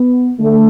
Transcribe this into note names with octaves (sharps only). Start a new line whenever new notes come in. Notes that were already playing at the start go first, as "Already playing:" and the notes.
Already playing: B3
D3 A3